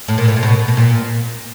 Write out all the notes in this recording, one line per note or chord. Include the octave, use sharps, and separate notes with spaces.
A2
A#2
A2
A#2
B2
B2
A#2